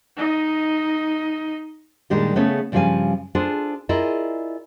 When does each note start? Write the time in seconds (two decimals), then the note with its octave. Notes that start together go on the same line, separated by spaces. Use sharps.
0.16 D#4 D#5
2.10 A#2 D#3 G3 G#3 D4 G4
2.36 C#3 A3 B3 C#4 G#4 A4
2.72 G2 C#3 F3 G3 F5 G#5
3.35 D4 F4 G#4 A4 C5
3.89 E4 F4 G#4 A#4 D5 D#5